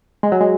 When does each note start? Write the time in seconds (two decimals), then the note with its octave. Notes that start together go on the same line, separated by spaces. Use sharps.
0.23 G#3
0.32 F#3
0.41 G#3